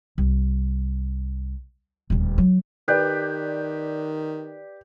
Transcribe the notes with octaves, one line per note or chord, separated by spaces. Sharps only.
C2
D#1 D2
F#3
D#3 G4 B4 D5 F#6 G6